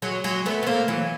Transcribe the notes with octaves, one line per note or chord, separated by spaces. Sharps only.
F#3 G#3
F#3 G#3
A3 B3
B3
A#3 C4
E3 F#3